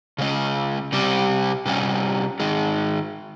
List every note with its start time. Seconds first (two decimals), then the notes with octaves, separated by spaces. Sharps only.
0.18 C#3 G#3 C#4
0.92 C3 G3 C4 G4
1.66 C3 G3 C#4
2.40 D#3 G#3